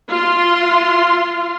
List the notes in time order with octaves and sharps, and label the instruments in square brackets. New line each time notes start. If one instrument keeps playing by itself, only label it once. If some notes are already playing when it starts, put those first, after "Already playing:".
[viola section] F4 C6